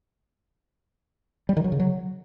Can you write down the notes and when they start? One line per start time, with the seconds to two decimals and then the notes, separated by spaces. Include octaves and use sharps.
1.49 G3
1.57 D#3
1.64 F#3
1.72 C#3
1.80 F#3